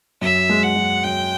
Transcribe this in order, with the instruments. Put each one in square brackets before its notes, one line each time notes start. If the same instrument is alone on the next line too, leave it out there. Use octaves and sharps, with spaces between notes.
[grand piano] F#2 [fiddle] E5
[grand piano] G#3
[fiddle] F#5
[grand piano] F#2
[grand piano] F#2 [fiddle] G5